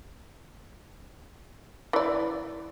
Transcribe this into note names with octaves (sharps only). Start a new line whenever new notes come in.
E3 D5